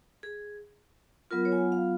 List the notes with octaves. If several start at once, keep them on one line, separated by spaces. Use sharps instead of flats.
G#4
F#3 B3 F4 A#4
C#5
G#5
F#5
F5